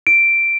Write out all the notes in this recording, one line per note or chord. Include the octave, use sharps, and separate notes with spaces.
D7